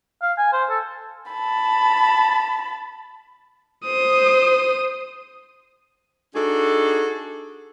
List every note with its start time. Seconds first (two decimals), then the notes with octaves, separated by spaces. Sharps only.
0.22 F5
0.38 G#5
0.53 C5
0.70 A4
1.32 A5 B5
3.86 C5 D#6
6.34 D4 D#4 F#4 G#4 A4